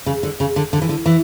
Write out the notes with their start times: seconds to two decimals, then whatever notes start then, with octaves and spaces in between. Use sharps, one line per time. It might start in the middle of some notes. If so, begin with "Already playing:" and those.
0.06 C#3
0.23 D3
0.40 C#3
0.56 D3
0.73 D3
0.82 E3
0.89 D3
1.06 E3